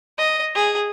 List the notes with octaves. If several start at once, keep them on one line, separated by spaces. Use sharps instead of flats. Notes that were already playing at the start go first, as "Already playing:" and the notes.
D#5
G#4